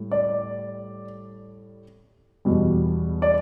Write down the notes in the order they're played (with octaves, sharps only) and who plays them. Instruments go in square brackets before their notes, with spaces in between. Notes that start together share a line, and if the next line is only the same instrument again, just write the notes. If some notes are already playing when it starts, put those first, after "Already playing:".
Already playing: [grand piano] A2 G3
D5
E2 B2 G3
D5